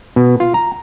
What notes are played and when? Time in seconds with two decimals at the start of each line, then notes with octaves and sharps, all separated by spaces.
0.16 B2
0.40 F4
0.54 A#5